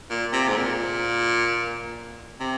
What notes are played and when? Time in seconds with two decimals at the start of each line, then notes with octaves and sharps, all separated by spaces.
0.10 A#2
0.32 C3
0.48 G#2
0.57 A#2
2.40 C3